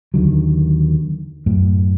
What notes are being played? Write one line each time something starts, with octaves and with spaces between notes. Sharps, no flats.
D#2 D3 D#3 F#3
F#2 A2